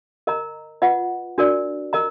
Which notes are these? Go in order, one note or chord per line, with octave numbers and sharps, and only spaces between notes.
A#4 D#5 A#5
F4 B4 D#5 F#5
D4 F#4 A#4 D5
A#4 D#5 A#5